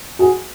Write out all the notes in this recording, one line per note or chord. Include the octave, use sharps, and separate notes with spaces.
F#4 G#4